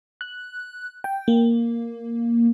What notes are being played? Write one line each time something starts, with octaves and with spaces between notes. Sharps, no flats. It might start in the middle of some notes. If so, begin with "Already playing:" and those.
F#6
G5
A#3